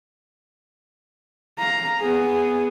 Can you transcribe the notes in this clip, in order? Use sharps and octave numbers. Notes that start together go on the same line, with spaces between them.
F5 A#5
B3 G#4